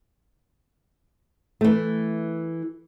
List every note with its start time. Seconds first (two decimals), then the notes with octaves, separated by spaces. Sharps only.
1.61 E3 A3